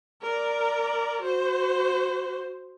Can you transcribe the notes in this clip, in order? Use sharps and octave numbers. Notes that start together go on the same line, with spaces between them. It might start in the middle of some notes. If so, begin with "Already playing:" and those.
A#4 D5
F#4 C5